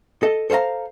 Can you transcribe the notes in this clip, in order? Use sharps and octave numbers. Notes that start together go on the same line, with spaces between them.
A4 D#5
A4 C5 C#5 F5 A#5